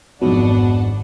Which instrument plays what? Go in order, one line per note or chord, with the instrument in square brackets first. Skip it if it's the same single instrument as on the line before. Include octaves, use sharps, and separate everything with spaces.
[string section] G#1 D4 F#5 [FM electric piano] F2 G#2 F#3 [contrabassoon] B2